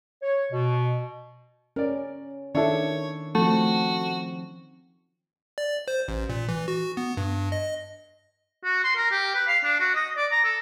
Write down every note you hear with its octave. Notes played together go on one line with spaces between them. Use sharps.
C#5
B2
C#4 A#4 D5
D#3 D4 E4 A4 C#5
F3 A3 C4 F#4
D5
C5
A1
A#2
E3
F#4
B3
G2
D#5
F#4
C6
A#4
G4
B4
F5
D4
F#4
D#5
D5
A#5
A4